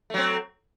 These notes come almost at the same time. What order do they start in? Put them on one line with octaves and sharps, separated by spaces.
A3 F#3 C4